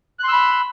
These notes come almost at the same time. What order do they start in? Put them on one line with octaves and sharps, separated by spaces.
F#6 C6 E6 B5